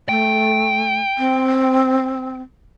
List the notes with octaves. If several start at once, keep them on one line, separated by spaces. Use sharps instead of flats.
A3 G5
C4